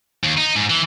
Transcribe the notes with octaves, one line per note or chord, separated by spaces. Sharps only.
D#2
D#4
G#2
E3